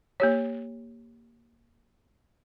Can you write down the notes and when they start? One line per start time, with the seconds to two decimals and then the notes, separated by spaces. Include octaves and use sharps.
0.20 A#3 G4 C#5